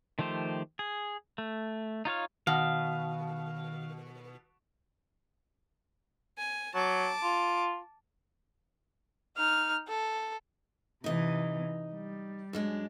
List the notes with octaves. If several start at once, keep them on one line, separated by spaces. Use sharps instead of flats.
D#3 F3 A3 G4 C5
G#4
A3
D#4 F4 C#5 F5
B2 D#3 F5
G#5
F#3 A5 D6
F4
D#4 F6
A4
C3 E3 D#4 D#5
G3
F#2 G#3 D4